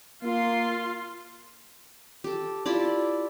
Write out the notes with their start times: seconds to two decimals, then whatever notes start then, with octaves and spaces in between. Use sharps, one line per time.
0.23 A#3 F4 C6
2.24 G4 A4
2.66 E4 F4 G4 D5